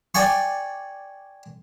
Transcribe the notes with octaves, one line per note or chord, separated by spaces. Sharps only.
D5 G5 G#5 C#6